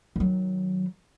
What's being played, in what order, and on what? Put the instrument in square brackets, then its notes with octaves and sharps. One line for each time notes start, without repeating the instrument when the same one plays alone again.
[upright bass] D#3 F#3